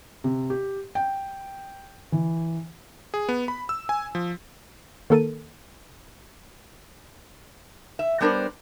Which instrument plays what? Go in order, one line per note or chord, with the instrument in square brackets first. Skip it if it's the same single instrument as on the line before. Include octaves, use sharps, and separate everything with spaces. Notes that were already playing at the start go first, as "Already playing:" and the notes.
[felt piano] C3
G4
G5
E3
[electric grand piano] G#4
B3
B5
E6
G#5
F3
[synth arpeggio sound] D#3 A#3 A4 A#4 A5 D#7
[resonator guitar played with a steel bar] E5
G3 B3 D4 A#4 C5